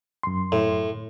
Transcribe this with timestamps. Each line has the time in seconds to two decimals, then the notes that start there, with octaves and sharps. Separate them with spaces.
0.23 F#2 C6
0.52 A2